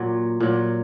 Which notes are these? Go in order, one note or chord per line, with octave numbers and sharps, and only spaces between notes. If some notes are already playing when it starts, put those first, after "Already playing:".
Already playing: A#2 F#3
A#2 F#3